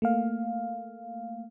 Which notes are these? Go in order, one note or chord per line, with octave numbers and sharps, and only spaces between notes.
A3 A#3 F5